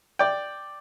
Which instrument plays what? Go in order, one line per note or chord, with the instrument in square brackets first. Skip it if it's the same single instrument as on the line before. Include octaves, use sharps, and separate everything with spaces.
[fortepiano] D5 G5